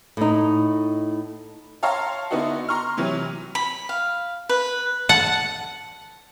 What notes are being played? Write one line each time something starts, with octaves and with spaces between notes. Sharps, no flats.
A2 D#4
C#5 F5 A5 A#5 C6
D3 B3 D#4 E4 F#4
A#5 C6 C#6 F6
C3 E3 F#3
B5
F5
B4
F#5 A5